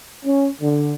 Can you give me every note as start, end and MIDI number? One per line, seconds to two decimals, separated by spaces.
0.25 0.50 61
0.61 0.95 50